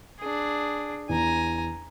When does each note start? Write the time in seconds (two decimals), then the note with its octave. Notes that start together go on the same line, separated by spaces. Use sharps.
0.20 D4 G#4
1.09 E2 G#5 A#5